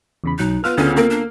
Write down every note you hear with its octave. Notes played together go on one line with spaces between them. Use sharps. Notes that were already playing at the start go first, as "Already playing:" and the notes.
E2 C#3 B5
B1 F#3 D#4 F#6
B3 F4 B4 E6 F6
D2 C#3 C#4
A#3 C4
D4